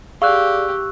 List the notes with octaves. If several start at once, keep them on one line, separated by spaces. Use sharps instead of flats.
G4 G#4 D5 F5 C#6 E6 F#6